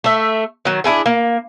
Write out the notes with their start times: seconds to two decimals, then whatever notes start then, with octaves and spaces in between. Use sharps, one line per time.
0.04 A3 E5
0.65 D#3 F#3
0.84 D4 E4 G#4 A4
1.06 A#3